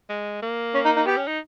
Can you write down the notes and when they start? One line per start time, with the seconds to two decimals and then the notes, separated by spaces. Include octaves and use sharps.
0.10 G#3
0.42 A#3
0.74 C#4
0.85 D#4
0.96 D#4
1.06 B3 G4
1.17 C#4
1.28 D#4